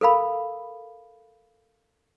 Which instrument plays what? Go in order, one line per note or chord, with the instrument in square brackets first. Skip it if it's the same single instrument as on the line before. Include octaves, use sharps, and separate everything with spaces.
[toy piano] A4 A#4 F5 B5